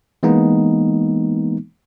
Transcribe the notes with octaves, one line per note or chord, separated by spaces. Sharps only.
E3 G#3 A#3 B3 D#4